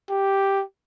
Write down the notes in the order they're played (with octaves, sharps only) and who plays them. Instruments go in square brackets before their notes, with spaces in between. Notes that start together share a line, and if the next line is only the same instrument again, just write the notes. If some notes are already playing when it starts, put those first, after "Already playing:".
[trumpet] G4